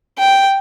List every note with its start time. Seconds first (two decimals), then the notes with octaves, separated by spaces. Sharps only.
0.18 G5